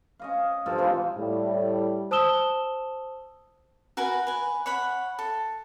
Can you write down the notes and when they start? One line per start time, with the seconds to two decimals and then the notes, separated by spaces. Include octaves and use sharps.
0.19 C#4 D#5 F5
0.66 G2 A#2 F3 A4
0.78 C3 E3 F3 G#3
1.17 A2 G3
2.11 C5 A5 D#6 E6 E7 G7
3.97 F#4 A#4 B4 G#5
4.27 B4 G#5
4.66 C#5 F#5 B5
5.19 A4